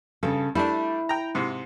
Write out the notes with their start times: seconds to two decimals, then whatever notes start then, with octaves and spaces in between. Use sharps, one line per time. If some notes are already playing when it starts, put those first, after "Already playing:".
0.23 G2 C#3 A4
0.55 G3 A3 D4 E4
1.09 G5 A#5
1.35 G#2 C3